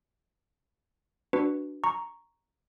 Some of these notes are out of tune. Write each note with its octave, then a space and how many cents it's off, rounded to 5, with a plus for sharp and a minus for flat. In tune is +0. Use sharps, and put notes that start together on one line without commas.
D4 +0 F#4 +0 B4 +0
A#5 +0 C#6 +0